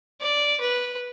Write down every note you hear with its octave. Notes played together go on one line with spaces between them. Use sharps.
D5
B4